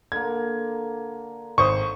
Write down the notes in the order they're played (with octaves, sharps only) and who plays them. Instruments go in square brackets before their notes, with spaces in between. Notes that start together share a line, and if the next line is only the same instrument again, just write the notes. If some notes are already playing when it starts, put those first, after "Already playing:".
[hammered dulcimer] D3 A#3 [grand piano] G#6
[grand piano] G#1 C5 D#6 [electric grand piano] C#6